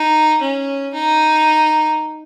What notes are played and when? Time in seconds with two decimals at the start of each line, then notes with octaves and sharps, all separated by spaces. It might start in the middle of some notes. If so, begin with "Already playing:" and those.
Already playing: D#4
0.42 C#4
0.94 D#4